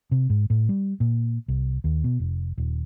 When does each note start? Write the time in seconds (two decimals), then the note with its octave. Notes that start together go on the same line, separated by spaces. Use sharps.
0.11 C3
0.30 G#2
0.50 A2
0.69 G3
1.00 A#2
1.48 C2
1.84 D#2
2.04 B2
2.20 F1
2.58 D#1